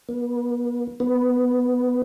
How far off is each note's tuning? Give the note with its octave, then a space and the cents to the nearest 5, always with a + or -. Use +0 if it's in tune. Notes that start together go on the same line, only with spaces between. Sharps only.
B3 -35
B3 +10